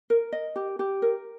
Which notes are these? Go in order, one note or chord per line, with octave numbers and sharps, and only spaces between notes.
A#4
D#5
G4
G4
A#4